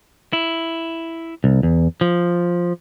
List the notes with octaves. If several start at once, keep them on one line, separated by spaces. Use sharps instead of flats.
E4
C2
E2
F3